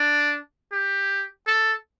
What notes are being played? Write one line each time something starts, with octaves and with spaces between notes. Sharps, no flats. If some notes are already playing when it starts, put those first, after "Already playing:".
Already playing: D4
G4
A4